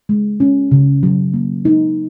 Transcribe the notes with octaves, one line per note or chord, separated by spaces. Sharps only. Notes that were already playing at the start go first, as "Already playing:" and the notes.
G#3
C#4
C#3
F#3
A#3
D#4